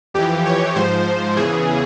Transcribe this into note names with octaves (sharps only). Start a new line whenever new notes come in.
F2 E3 G4
C#5
G#2 F3 C5
E2 C#3 E3 G#4